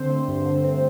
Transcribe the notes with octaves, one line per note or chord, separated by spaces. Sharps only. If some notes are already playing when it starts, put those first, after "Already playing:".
Already playing: D3 C4 C5
A3
G2
D3
C4